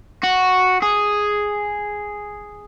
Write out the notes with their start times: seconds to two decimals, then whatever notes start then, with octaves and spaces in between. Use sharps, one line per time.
0.23 F#4
0.82 G#4